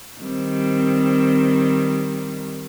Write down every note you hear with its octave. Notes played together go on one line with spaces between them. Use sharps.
D#3 G3 C4